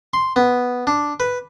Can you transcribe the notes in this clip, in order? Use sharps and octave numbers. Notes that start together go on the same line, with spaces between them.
C6
B3
D4
B4